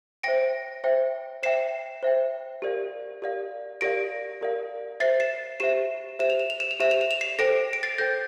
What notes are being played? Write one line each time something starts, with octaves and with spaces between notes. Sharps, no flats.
C5 E5 G5 A#6 D7
C5 E5 G5
C5 E5 G5 C7 E7
C5 E5 G5
G4 A#4 D5 F5
G4 A#4 D5 F5
G4 A#4 D5 F5 A#6 D7
G4 A#4 D5 F5
G4 C5 E5 A6 C7
C7 E7
G4 C5 E5 C7 E7
G4 C5 E5 E7
F7
E7
F7
E7
F7
G4 C5 E5 E7
F7
E7
F7
C7 E7
A4 C5 G5 A#6 D7
D7
A6 C7
A4 C5 G5 G6 A#6